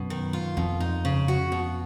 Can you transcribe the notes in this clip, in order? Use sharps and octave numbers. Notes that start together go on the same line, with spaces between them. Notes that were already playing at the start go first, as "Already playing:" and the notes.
Already playing: F#2 B2
D#3
F4
F2 B2
D#4
C#3
F#4
B2